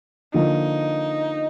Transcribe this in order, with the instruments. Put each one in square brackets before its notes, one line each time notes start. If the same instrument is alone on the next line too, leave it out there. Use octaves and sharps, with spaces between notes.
[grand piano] D3 F3 A#3 [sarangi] D#4